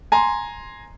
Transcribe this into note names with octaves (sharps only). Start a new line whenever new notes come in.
G#5 A#5 C6